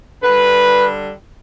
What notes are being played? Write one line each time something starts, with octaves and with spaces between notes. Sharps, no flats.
D3 G3 B4